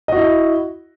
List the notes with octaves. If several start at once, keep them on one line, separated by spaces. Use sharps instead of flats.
E4 F#4 D#5